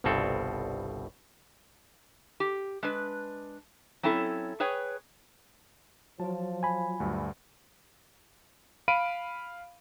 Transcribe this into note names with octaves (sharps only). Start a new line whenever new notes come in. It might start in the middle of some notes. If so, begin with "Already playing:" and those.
G1 C2 G2 B2 C4 A4
G4
G#3 D4 B4
F#3 C4 C#4 E4 A4
G#4 B4 C#5 G5
F3 F#3 F4 A5
G#5 B5
D2 G2
F5 B5 D7 D#7